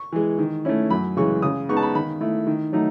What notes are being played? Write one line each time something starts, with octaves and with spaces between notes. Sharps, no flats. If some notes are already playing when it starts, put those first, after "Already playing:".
Already playing: C#6
E3 G#3
D#3
A3 C#4 E4
F#2 B5
C#3 E3 G#3 C#6
C#3 D#6
G#3 B3 D#4 C#6
A5
B5
D#3 B5
A3 E4
D#3
F#3 A3 D#4